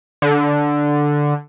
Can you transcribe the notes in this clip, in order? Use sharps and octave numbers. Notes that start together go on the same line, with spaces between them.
D3